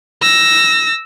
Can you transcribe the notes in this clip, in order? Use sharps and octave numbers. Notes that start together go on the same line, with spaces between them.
E6 A#6